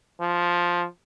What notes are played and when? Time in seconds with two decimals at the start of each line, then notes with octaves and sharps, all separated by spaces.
0.20 F3